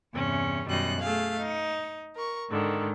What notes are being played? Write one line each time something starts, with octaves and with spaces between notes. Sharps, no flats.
E2 G2 C3 C#4
F#2 B2 D#3 G3 D#5 F#6
A3 G#4 F5
D#4
A#4 C#6
G#2 D3 D#3